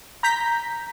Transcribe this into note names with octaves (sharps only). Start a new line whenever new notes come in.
A#5 G6 B6